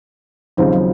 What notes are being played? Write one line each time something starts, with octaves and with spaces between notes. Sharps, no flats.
D#2 C#3 F3 F#3 C4 D#4
F#3